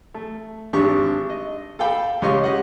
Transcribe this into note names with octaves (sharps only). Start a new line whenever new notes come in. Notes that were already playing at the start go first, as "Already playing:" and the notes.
A3
G#1 D4 G4 C#6
D#5
A4 F5 G5 A5 B5
C#2 G4 C#5 D#5 C6 C#6
G4 D#5 F#5